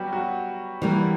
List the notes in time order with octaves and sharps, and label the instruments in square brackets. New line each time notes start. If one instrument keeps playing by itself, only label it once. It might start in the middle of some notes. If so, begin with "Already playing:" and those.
Already playing: [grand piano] F#3 G3 B3 F#4 G4
F#3 F#4
[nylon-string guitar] E3 G3 A#3